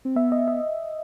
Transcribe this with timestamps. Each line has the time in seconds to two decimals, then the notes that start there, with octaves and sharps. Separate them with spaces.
0.05 C4
0.16 B3 E5
0.32 D#5
0.48 E5